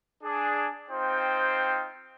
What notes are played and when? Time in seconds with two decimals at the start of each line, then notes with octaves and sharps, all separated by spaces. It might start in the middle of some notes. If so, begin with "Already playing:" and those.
0.24 D4 G#4
0.91 C4 D#4 F4 C5 G5